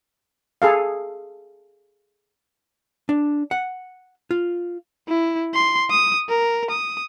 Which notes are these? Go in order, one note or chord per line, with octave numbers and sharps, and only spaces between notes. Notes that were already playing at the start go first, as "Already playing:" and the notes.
G#4 A4 F5
D4
F#5
F4
E4
C6
D#6
A#4
D#6